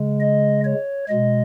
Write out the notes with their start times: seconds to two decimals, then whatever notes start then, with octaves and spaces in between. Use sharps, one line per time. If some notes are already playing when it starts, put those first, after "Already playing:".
Already playing: C#3 G#3
0.20 D#5
0.65 C#5
1.09 B2 G#3 D#5